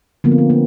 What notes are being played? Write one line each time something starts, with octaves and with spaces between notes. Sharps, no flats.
D3 F3 A#3 B3
C4
B3
A#3